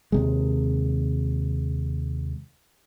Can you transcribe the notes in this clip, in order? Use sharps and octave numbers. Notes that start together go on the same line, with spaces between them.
D#2 C3 G#3